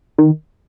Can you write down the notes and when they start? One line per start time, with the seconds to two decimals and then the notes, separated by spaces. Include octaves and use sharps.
0.18 D#3